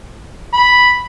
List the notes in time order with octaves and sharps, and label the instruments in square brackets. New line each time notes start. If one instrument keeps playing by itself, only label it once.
[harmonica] B5